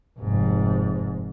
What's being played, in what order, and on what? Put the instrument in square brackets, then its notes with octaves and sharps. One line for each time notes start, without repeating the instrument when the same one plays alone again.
[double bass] F1 G#2